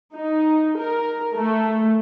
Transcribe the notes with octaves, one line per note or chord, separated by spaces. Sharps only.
D#4
A#4
A3